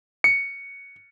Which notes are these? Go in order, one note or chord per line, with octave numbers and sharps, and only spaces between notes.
C#7